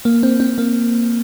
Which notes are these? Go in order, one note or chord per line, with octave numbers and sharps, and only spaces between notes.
A#3
C4
C4
A#3